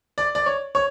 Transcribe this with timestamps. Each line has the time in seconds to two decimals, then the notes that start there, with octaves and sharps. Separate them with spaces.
0.18 D5
0.35 D5
0.46 C#5
0.75 C#5